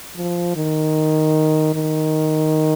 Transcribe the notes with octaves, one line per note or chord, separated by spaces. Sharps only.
F3
D#3
D#3